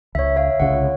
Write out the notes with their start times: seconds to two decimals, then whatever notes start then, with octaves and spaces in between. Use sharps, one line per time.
0.15 C#2 C#5 E5
0.36 C#5 E5 F5
0.60 C2 C#3 C#5 F#5